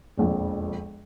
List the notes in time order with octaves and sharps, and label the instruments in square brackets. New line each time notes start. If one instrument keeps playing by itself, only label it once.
[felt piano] E1 A#1 F2